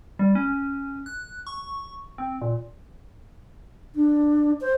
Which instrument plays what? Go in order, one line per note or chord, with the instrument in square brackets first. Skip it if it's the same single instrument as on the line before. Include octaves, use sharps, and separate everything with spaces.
[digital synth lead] G3
C#4
F#6
C#6
C4
A#2
[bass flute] D4
C5